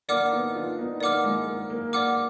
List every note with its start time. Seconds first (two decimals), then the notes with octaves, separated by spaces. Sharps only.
0.08 A#3 D4 D5 F#5 D6 F6
0.32 B3 D#4
0.55 D4 F4
0.78 B3 D#4
1.00 A#3 D5 F#5 D6 F6
1.24 G#3
1.46 A#3
1.70 A#3
1.93 D5 F#5 D6 F6